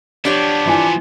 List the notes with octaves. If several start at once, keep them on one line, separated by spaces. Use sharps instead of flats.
F3 B3 D4 G4 C#5
E3 F4 G#5